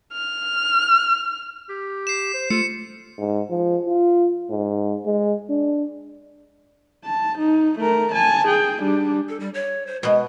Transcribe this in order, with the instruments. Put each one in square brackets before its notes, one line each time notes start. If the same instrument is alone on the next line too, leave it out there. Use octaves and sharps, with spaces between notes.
[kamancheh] F6
[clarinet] G4
[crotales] C7 E7
[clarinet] C5
[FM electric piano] A3 [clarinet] F4 [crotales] C#7
[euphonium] G#2
F3
F4
G#2
G#3
D4
[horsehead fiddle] A5
D#4
A3 A#4
G#5 A5
G#4 G5
G3 D4
[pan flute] A4
G3
C#5
C5
[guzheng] B2 B3 [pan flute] G#3